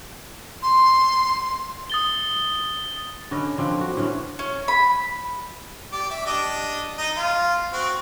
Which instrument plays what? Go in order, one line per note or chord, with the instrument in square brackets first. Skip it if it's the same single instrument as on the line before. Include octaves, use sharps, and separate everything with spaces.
[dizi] C6
[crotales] D#6 A6 G7
[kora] D3 C#4 B4 D#5
D3 F3 C4
F#4
A2 D3 E3 C#4
[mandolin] C#4
B5
[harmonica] G4 D5
E5 D6
D4 G4 D#5
D#4 D#5
F4
C4 F#4